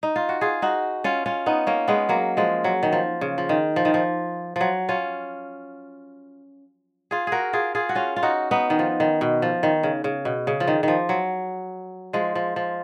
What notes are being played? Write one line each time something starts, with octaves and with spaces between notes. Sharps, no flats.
D#4
F4
F#4
F4 G#4
D#4 F#4
C#4 F4
C#4 F4
B3 D#4
A#3 C#4
G#3 B3
F#3 A#3
F3 G#3
F#3
D#3
F3
C#3
F3
D#3
F3
D#3
F3
F3 F#3
C#4 F4
F4 G#4
F#4 G#4 A#4
F4 G#4
F4 G#4
F#4
C#4 F4
F4
D#4 F#4
B3 D#4
D#3
F3
D#3
B2
F3
D#3
C#3
C#3
B2
C#3
F3
D#3
D#3 F3
F#3
F3 G#3
F3
F3